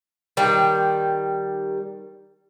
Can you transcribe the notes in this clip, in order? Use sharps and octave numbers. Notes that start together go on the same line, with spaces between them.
D#3 G3